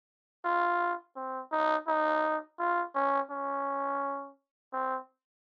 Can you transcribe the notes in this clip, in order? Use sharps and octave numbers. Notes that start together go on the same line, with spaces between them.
F4
C4
D#4
D#4
F4
C#4
C#4
C4